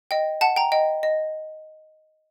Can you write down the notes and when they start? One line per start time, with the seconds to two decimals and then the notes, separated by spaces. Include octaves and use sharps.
0.11 D#5 G5
0.41 F#5 A5
0.56 G5 A#5
0.72 D#5 G5
1.03 D#5